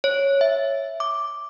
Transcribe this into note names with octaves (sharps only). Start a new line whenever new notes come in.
C#5
E5
D6